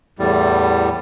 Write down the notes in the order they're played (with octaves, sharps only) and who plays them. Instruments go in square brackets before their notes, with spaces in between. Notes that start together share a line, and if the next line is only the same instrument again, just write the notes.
[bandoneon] E2 A2 G3